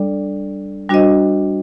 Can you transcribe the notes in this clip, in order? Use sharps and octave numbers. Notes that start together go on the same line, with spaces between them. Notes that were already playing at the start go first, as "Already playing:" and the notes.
Already playing: G3 D4 A4 D5
G3 D4 F#4 C5 D#5